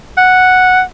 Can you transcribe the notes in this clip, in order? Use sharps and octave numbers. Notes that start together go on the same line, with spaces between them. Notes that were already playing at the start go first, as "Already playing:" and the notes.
F#5